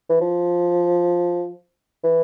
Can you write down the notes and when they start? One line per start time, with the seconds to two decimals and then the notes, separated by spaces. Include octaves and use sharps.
0.10 E3
0.21 F3
2.04 E3